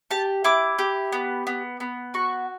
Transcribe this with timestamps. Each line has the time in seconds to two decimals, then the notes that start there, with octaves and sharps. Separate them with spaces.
0.11 G4 A5
0.44 E4 D6
0.79 G4
1.12 B3
1.47 B3
1.80 B3
2.14 F#4 C#6